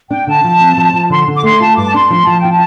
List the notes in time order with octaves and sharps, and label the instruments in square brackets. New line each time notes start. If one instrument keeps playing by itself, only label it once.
[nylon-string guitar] D4 [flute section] G5
[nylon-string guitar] D3 [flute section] A5
[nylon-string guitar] F3
C4
F3
F3
[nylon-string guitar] D3 [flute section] C6
[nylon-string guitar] D3
[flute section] D6
[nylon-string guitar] A3 [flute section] C6
[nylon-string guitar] F4 [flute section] A5
[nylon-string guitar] G2 [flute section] D6
[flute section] A5
[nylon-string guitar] D4 [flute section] C6
[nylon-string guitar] F3 [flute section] C6
[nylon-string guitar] F3 [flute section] A5
[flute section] G5
[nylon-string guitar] F4
[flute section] A5